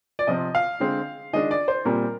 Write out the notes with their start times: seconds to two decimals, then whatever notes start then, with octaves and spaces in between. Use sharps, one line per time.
0.19 D5
0.27 C3 F3 C4 D#5
0.55 F5
0.80 D3 G#3 C4
1.33 D#3 G#3 D4 D#5
1.51 D5
1.68 C5
1.85 A#2 G3 C4 A#4